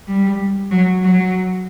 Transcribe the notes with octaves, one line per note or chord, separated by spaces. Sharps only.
G3
F#3
F#3